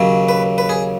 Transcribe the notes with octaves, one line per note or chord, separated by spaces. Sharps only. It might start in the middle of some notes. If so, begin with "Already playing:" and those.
Already playing: D#2 C#3 F#3
B4
B4
G#4